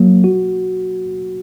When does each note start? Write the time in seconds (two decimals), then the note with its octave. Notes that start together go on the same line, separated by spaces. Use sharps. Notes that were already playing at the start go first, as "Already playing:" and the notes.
Already playing: F#3 A#3
0.24 F#4